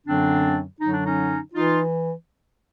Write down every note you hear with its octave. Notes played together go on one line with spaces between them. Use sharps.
F#2 D3 F#3 C4 D4
F#2 D3 F#3 D#4
D4
C#4 D#4
E3 D#4 F4